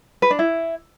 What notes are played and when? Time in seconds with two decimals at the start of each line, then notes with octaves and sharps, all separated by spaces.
0.22 B4
0.31 D4
0.39 E4